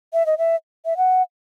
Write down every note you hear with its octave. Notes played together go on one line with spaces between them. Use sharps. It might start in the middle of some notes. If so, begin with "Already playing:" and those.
E5
D#5
E5
E5
F#5